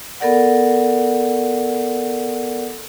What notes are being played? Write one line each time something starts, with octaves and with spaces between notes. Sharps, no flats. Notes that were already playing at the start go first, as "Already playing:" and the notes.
B3 A4 A#4 D5 F#5